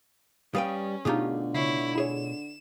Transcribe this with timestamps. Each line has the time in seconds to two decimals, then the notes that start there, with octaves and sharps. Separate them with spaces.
0.55 G3 C#4 B4 F5 G5 D#6
1.05 B2 D3 A3 D#4 F4 G4 G#4
1.54 C#3 E4 C#5 C7
1.95 E4 G#4 C#5 E7